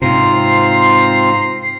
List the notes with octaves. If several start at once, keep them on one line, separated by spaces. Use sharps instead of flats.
G#2 C3 C4 F4 C5 A#5 C7